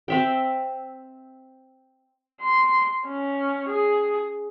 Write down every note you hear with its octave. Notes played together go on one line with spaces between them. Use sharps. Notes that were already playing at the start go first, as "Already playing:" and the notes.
C4 E5 G5
C6
C#4
G#4